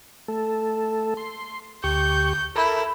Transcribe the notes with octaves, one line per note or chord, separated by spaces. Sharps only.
A3 A4
C6
D2 G4 C#6 G6
E4 A4 A#4